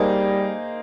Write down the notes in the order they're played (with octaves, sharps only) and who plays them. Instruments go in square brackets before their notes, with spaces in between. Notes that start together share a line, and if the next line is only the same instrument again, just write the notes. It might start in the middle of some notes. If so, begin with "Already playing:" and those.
Already playing: [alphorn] G3 [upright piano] A#3 D#4 G#4 C5 D#5